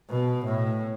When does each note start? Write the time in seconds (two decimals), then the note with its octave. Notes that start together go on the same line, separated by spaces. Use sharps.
0.10 B2
0.45 A2